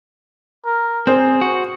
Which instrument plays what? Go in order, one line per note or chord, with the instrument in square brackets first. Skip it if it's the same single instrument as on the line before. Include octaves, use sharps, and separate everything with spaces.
[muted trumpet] A#4
[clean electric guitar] C4 [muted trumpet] G#4 [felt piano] C5
[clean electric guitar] F#4